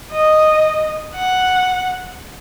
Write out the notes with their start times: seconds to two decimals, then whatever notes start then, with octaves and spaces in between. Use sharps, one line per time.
0.11 D#5
1.15 F#5